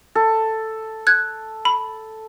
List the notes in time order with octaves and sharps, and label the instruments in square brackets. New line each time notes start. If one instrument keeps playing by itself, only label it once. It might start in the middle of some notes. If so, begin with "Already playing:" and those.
[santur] A4
[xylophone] F#6 G#6
B5